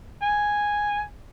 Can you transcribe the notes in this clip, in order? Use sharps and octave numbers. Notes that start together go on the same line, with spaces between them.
G#5